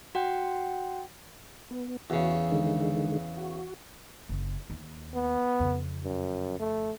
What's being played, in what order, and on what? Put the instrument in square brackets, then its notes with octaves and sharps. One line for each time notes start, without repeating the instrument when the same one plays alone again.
[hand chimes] F#4 F#5 G5
[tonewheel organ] B3
[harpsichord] E2 C#3 [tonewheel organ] F#4
[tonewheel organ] D3 D#3 G#3
F#4
[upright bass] F#1
D#2
[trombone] B3
[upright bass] F2 C#3
[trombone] F#2
A3